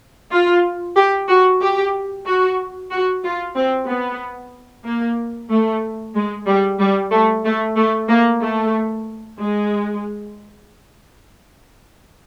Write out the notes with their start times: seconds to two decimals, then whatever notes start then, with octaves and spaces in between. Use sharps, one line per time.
0.32 F4
0.96 G4
1.28 F#4
1.61 G4
2.26 F#4
2.91 F#4
3.24 F4
3.56 C4
3.87 B3
4.85 A#3
5.51 A3
6.15 G#3
6.47 G3
6.80 G3
7.11 A3
7.45 A3
7.77 A3
8.09 A#3
8.41 A3
9.39 G#3